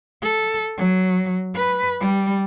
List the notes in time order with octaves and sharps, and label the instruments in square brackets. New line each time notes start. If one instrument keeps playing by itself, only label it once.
[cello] A4
F#3
B4
G3